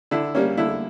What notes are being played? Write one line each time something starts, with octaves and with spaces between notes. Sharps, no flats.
D3 E4
G3 A#3 C#4
D3 E4